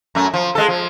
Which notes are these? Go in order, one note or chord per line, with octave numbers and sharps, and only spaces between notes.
F#2 A3
F3
G#3 A4
F3